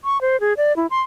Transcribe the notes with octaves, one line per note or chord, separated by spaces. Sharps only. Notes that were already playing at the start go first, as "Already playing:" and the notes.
C#6
C5
G#4
D5
E4
C6